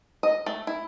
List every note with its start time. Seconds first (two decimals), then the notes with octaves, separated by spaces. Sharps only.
0.23 D#5
0.46 A3
0.67 E4